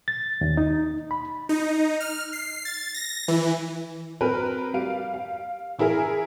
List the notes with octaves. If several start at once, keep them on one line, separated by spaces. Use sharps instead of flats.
A6
D#2
D#4
B5
D#4
F6
C7
A6
A#6
E3
F#3 C4 A#4 B4
G3 F5 D7
F5
E3 E4 G#4 A#4